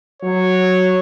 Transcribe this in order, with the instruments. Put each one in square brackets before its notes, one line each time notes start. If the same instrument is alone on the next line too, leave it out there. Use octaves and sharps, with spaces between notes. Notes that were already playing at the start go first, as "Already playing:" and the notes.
[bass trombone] F#3 [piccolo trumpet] C#5